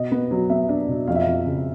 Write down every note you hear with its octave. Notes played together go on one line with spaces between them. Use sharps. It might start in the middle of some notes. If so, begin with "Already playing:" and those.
Already playing: B2 D#5
B3
F#3
B3 E5
D4
B2
F2 F5
E5
F2 F5
C#3